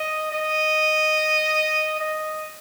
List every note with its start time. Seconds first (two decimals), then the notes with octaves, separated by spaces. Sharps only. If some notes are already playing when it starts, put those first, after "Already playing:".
Already playing: D#5
0.32 D#5
2.00 D#5